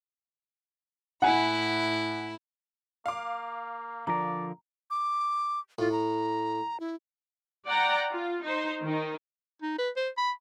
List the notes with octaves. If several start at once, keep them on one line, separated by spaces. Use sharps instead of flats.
A2 E4 F#5 G#5 B5
A#3 F5 D6
D3 F3 A#4 D5 A#5
D6
A2 F4
A#5
E4
D5 F#5 G5 A#5
F4
D#4 C5
D#3 D#4
D#4
B4
C5
B5